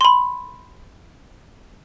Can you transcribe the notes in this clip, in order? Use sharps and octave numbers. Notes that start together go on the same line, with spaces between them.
B5 C6